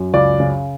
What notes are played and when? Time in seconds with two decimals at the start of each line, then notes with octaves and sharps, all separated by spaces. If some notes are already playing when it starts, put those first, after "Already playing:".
Already playing: F#2
0.13 C#2 D5
0.40 C#3